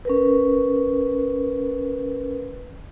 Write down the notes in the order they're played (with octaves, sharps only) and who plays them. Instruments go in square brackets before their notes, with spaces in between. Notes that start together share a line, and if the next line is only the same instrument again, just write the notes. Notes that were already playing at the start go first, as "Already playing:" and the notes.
[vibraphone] C#4 A#4 B4